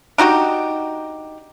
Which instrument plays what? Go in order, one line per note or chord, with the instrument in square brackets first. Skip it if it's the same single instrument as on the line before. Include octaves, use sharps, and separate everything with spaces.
[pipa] D4 D#4 F#4 G4